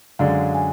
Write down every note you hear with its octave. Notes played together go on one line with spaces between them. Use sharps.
F#2 D3 G#3 D4 F5
G#5